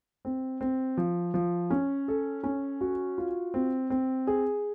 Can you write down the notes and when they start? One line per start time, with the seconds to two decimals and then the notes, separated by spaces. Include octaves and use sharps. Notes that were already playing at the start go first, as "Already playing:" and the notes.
0.25 C4
0.61 C4
0.97 F3
1.34 F3
1.70 C#4
2.08 A4
2.44 C#4
2.81 F#4
3.18 F4
3.54 C4
3.90 C4
4.27 G#4